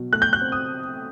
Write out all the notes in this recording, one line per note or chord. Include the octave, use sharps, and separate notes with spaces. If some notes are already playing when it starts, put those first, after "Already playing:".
Already playing: B2 F#3
A3 F#6
G6
F#6
C4
D#6